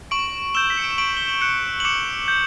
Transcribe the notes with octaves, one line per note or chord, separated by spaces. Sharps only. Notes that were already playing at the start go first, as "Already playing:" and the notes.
C#6 D7 F#7
E6 G6 E7 G7
B6
C#7
D7
E7
C#6 D7 F#7
G7
F#7
F#6 C#7 E7
F#7
D6 C#7 E7
G6